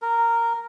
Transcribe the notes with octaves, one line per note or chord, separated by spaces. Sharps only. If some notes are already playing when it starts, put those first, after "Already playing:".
A#4